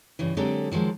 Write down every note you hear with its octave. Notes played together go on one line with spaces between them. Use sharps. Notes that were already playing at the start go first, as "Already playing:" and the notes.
G2 C#3 E3
D3 F#3 G#3 C4 G4 A4
D#3 F3 F#3 G#3